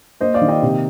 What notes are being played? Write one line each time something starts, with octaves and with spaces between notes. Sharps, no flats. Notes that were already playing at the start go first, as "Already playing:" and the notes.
A#3 C5 D#5
D5 F5
D#3
D#5 G5
C3